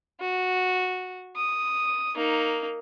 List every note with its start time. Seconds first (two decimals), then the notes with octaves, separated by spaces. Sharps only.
0.20 F#4
1.36 D#6
2.15 A#3 D#4